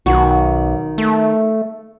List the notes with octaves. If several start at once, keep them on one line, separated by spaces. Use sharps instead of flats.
B1 D#3 F#4
A3